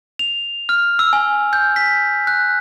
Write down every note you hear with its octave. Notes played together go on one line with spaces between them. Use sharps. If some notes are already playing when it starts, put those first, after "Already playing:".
F7
F6
E6
G#5
G6
B6
F#6